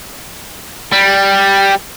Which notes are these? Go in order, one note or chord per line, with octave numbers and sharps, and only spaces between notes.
G3